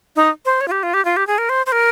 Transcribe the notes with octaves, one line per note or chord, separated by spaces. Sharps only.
D#4
C5
C#5
F4
G4
F4
G4
F4
G4
G#4
A#4
C5
C5
A#4